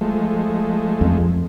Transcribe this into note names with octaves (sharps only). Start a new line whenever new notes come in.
F3 G#3 A3
F2